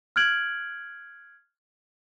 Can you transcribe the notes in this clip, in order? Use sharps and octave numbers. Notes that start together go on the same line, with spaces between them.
F6 F#6 G#6 D7 F#7